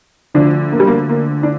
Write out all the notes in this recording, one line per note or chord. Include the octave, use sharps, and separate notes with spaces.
D2 D3 F3 D4
A#3
G3
A#3
A#3
D4